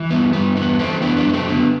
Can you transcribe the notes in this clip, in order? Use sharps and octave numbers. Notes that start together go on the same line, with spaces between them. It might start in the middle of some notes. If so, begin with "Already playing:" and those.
Already playing: E3
G2 B3
G2 B3
E3 B3
E3 A3 C4
F#2 B3 D4
B3 D4
F#2
A3 C4
D3 B3